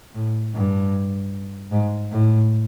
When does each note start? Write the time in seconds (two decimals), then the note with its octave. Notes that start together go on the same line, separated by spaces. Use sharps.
0.15 A2
0.54 G2
1.71 G#2
2.12 A2